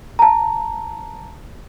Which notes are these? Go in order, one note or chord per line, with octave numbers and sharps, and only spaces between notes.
A5 A#5